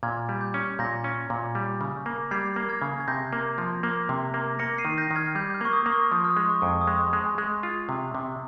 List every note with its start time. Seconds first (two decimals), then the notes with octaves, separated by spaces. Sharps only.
0.03 A#2 F6 G#6
0.29 G3
0.41 G6
0.54 C#4
0.79 A#2 G6 A#6
1.04 C#4
1.30 A#2
1.55 G3
1.81 C#3
2.06 A#3
2.31 G3 G#6 C7
2.56 A#3
2.69 F6 G#6
2.82 C#3
3.00 G#6
3.08 C3 G6 A#6
3.33 A#3
3.58 F3
3.83 A#3
4.09 C3
4.34 A#3
4.59 A#3 A#6 C#7
4.78 C7 D#7
4.85 D#3
4.98 G6 A#6
5.11 D#3
5.16 F6 G#6
5.35 G3 G6
5.50 G6
5.54 F6
5.61 A#3 C#6
5.73 D#6
5.86 A#3
5.92 C#6
6.12 F3 D#6
6.24 F6
6.31 D#6
6.37 G#3
6.50 C#6
6.62 F2
6.69 C#6
6.81 D#6
6.87 G#3 C#6
7.07 C6
7.13 G#3
7.26 G#5
7.38 G#3
7.63 F4
7.89 C3
8.15 C3